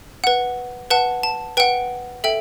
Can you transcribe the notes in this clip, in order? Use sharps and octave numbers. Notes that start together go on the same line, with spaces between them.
B4 F#5
B4 F#5 A5
A5
B4 F#5 G5
A4 E5 G5